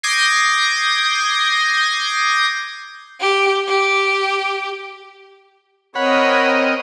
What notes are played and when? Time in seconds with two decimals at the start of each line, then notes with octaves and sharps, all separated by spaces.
0.03 D6 D#6 G6 G#6 A#6 C7
3.21 G4
3.69 G4
5.95 C4 A#4 C#5 D#5 F#5 B5